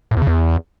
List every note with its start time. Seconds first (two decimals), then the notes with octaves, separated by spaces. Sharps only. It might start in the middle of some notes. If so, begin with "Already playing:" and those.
0.11 A2
0.16 E2
0.22 C#3
0.27 E2